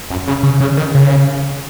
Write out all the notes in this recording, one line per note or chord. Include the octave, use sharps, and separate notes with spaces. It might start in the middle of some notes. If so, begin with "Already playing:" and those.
F#2
C#3
C#3
C#3
D#3
C#3